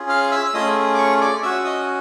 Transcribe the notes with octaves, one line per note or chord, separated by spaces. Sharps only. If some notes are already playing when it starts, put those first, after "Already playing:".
Already playing: C#4 F4 G#4
F5 F6
E5 E6
E6
A3 C#4 F4 G#4 D#5 D#6
D6
C#5 C#6
D5 D6
C#4 F#4 E5 E6
D#5 D#6